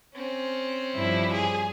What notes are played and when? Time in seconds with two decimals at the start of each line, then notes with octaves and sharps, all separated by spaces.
0.14 C4 C#4
0.96 G2 F3 E4
1.33 G#4